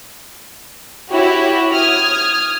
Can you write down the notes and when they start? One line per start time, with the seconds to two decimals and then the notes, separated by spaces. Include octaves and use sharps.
1.12 E4 F#4 G4 C#5
1.74 D#6 F6 G#6